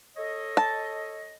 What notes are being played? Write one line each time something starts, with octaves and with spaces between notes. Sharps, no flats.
A4 C#5 D#5
A5